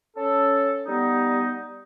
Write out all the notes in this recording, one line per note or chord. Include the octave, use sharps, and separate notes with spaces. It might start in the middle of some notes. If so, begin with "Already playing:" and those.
C#4 A4
G3 B3 D#4